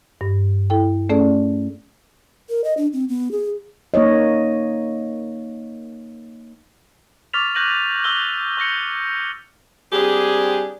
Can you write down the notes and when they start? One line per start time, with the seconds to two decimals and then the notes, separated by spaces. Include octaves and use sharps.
0.21 G2
0.70 E4 A4 G5
1.10 A3 C#4 G#4 A4 D5
2.49 A#4
2.64 D#5
2.77 D4
2.93 C4
3.08 B3
3.31 G#4
3.94 A#3 D#4 C#5 D#5
7.33 C#6 D6 F6 A6 B6 F7
7.55 C#6 F#6 G6 A#6 D#7 F#7
8.04 C#6 E6 G6 G7
8.57 C#6 G6 A#6 C#7
9.93 G3 C4 D4 G4 G#4